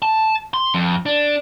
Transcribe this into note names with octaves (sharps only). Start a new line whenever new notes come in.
A5
C6
F2
D4